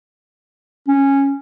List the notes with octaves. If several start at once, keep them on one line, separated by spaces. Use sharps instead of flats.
C#4